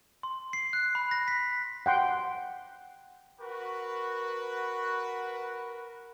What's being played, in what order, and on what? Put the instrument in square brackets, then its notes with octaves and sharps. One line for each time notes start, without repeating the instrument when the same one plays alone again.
[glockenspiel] C6
C7
F#6
B5
A#6
B6
[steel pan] F#5 G5 C6
[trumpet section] F#4 B4 [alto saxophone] A#4